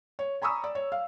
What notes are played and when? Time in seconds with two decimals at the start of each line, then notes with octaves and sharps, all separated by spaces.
0.19 C#5
0.42 G#5 A#5 B5 C#6 D#6 E6
0.64 D5
0.75 C#5
0.92 F5